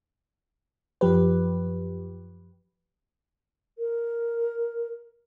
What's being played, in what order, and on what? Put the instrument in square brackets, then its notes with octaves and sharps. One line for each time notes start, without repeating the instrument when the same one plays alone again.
[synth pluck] F#2 F3 G4 B4
[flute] A#4